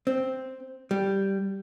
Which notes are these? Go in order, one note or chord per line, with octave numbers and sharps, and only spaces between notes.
C4
G3